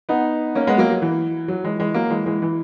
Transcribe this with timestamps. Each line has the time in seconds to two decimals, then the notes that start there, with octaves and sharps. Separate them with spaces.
0.09 B3 D#4
0.55 A#3 C#4
0.67 G#3 B3
0.78 F#3 A#3
0.91 F#3
1.02 E3
1.48 F#3
1.64 E3 G#3
1.79 E3 G#3
1.94 F#3 A#3
2.10 E3 G#3
2.26 E3 G#3
2.42 E3